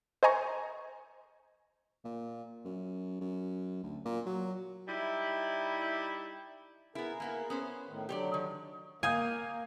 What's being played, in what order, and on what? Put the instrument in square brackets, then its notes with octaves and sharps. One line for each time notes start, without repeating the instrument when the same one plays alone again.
[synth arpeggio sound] C5 D#5 G#5 A#5 C#6
[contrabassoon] A#2
F#2
F#2
D2
A#2
F#3
[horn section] G3 D#4 E4
[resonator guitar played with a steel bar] B3 E4 [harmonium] G#4 A#4
[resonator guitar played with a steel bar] A#3 B3 E4
B3 C#4 C5
[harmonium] A2 D#3
[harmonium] D3 F#3 [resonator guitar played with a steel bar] G4 C#5 D5
[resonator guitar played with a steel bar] D#3
[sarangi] A#3 [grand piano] F5 D#6 G6 [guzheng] G#5